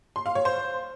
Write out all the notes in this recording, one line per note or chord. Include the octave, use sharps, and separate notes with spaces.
C6
F5
C#5
C5